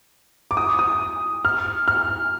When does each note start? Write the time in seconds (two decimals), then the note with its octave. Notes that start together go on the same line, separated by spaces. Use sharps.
0.51 D6
0.57 D#6
0.79 D#6
1.45 F6
1.88 F6